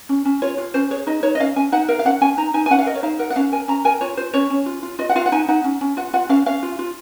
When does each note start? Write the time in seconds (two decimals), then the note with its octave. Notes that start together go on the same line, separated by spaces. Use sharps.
0.09 C#4
0.25 C#4
0.42 F4 C#5
0.58 F4
0.74 C#4 C5
0.90 G#4 C#5
1.07 D#4 D#5
1.23 D#4 C#5
1.35 D#5
1.40 C#4 F5
1.56 C#4 G#5
1.72 D#4 F#5
1.88 A#4 F5
1.99 F5
2.05 C#4 F#5
2.21 C#4 G#5
2.37 D#4 A#5
2.54 D#4 G#5
2.66 G#5
2.70 C#4 F#5
2.79 F5
2.86 A#4 D#5
2.95 C#5
3.03 D#4 F5
3.19 A#4 F#5
3.30 F#5
3.36 C#4 F5
3.52 A#4 G#5
3.68 C#4 A#5
3.85 A#4 G#5
4.01 F4 C#5
4.17 F4 C5
4.34 C#4 C#5
4.50 C#4
4.66 F4
4.83 F4
4.99 F4 D#5
5.09 F#5
5.16 F4 F5
5.26 F#5
5.32 D#4 G#5
5.48 D#4 F#5
5.64 C#4
5.81 C#4
5.97 F4 F#5
6.13 F4 F#5
6.29 C#4 F5
6.46 C#4 F5
6.63 F4
6.79 F4